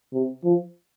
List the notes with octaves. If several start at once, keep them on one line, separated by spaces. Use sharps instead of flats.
C3
F3